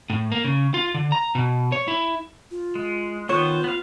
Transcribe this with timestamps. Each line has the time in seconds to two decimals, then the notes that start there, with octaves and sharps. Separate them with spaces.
0.10 A2
0.32 A#3
0.44 C#3
0.74 F4
0.94 D3
1.12 A#5
1.35 B2
1.72 C#5
1.88 E4
2.51 F4
2.75 G#3
3.29 D#3 B3 F4 C5 C#5
3.64 B3 F5